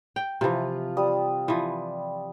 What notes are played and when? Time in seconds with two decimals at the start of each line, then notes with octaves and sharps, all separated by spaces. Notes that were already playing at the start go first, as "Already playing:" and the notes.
0.16 G5
0.41 C3 E3 F3 F4
0.97 G3 D#6
1.48 E3 F3